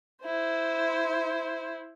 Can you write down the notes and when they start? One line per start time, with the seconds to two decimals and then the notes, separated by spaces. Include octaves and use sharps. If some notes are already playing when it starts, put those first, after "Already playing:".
0.23 E4 C5